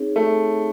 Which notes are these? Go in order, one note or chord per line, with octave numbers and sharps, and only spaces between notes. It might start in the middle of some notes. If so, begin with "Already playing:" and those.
Already playing: C4 D#4 G#4 C#5
A3 C4
D#4 G#4 C#5